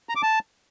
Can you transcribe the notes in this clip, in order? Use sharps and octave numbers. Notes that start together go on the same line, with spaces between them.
A#5
D6
A5